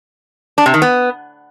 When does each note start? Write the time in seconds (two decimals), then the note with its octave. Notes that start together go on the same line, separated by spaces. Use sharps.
0.58 D4
0.66 C3
0.74 D#3
0.82 B3